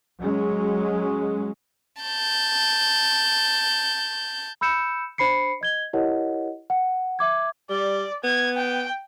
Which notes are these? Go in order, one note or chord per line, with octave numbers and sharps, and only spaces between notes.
F#3 G#3 C#4
A5 G6
B5 E6 G6 C#7 E7
D4 C5 B5 C7 C#7
D#5 G#6 G7
E4 G4 A#4 C#5 D#5 F#5
F#5
E5 D6 G#6
G3 D5
B3 G#6
G5